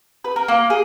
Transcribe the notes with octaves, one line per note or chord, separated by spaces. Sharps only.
B4
A#4
A#3
G#4